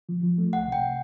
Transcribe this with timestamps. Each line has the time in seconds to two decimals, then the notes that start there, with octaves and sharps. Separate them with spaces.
0.09 F3
0.23 F3
0.38 A3
0.53 C2 F#5
0.67 C3
0.72 G5